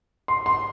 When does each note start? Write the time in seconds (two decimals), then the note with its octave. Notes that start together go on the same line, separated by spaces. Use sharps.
0.28 C6
0.46 C6